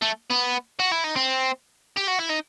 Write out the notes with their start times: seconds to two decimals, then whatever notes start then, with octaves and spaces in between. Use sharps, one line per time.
0.02 A3
0.31 B3
0.80 F#4
0.92 E4
1.04 D#4
1.16 C4
1.97 G4
2.08 F#4
2.20 E4
2.30 D#4